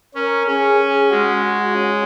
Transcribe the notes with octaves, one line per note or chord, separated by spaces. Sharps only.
C#4 A#4
C#4 G#4
G#4
G#3 F#4
F#4
C#4